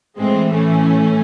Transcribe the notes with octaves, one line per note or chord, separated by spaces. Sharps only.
A2 E3 G#3 C4
A3 C#4